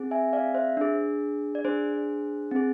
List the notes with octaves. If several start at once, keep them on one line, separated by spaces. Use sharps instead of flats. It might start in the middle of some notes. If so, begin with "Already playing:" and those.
Already playing: C4 G#4
E5 G#5
D5 F5
C5 E5
D4 G#4
D5
D4 G#4 C5
C4 G#4